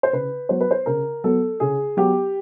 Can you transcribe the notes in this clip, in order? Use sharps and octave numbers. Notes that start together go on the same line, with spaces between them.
C5
C#3 B4
F#3 B3 C5
B4
C5
C#3 A#4
F#3 B3 A4
C#3 G#4
F#3 B3 G4